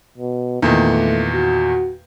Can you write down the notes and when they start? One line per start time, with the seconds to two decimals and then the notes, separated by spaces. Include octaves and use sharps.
0.18 B2
0.62 E2 A#2 D#3 A3
1.34 F#4